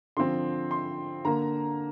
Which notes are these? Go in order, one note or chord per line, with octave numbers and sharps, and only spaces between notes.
D3 F3 C4 C6
C6
D3 A#3 A#5